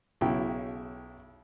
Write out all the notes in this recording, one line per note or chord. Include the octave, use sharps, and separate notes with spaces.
B1 C#3 E4 G5